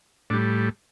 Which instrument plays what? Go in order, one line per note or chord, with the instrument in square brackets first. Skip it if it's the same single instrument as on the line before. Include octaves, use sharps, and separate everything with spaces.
[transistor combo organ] A2 G3 D4